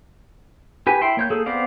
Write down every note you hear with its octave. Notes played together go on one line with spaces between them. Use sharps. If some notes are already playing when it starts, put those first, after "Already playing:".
G4 B4 G#5
E4 G5 C6
A#3 C#5 G6
A#3 G#4 A4
B3 C4 C5 D5 F5